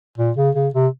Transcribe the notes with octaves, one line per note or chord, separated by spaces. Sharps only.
A#2
C#3
C#3
C3